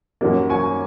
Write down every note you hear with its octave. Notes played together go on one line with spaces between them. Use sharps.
F#2 F#3 A#3
G#5 C#6